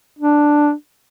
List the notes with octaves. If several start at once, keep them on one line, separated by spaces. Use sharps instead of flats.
D4